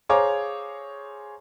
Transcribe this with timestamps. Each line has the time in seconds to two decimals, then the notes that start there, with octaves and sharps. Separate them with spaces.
0.09 G#4 C5 C#5 F5 A#5 D6